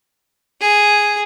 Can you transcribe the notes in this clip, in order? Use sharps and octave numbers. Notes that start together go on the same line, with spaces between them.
G#4